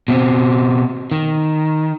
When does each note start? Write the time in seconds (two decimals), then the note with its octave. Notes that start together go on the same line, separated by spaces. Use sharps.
0.08 B2 C4
1.12 D#3